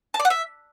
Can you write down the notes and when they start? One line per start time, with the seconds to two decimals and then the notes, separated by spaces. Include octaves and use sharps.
0.14 A5
0.20 D5
0.25 F#5
0.30 E5